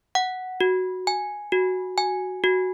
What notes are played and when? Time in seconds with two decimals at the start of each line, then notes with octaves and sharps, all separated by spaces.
0.15 F#5
0.61 F#4
1.07 G#5
1.52 F#4
1.98 G#5
2.44 F#4